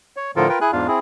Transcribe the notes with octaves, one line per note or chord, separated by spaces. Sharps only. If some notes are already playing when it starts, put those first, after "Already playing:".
C#5
A2 D3 F3 F4 A4 A#4
F4 A#4 B4 G5
E4 G#4 G#5 F#6
E2 G#2 D4 F4 F5
C4 E4 G#4